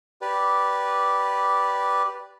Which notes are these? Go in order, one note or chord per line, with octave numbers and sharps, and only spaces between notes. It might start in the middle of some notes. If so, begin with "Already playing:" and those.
G4 B4 D5